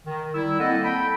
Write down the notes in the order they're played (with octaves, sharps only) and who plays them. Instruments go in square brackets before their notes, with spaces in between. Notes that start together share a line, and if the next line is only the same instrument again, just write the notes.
[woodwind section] D#3
G3 E4 E6
A#3 C4 A4 D#5 F#5
A4 G5 B5